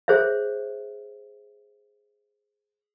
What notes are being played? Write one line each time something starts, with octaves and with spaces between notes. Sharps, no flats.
G#4 C5 C#5 E5